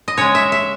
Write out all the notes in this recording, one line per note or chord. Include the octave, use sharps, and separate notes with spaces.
D#5
C#3 G#3 C#5
E5
E5